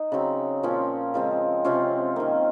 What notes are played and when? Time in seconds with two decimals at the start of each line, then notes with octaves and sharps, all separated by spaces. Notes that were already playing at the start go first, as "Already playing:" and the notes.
Already playing: D#4
0.12 C#3 F#3 C4
0.63 A#2 F3 C4 C#4
1.14 C#3 F3 G#3 C4
1.65 C3 F3 C4 C#4 F4
2.16 D#3 A#3